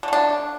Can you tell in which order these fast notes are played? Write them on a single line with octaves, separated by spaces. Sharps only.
D3 A3 D4